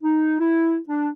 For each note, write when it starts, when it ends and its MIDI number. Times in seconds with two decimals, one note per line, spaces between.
0.03 0.39 63
0.39 0.77 64
0.88 1.08 62